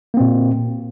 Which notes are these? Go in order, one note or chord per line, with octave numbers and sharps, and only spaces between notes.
A#2 A#3 C4